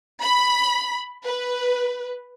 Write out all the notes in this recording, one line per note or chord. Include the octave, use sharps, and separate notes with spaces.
B5
B4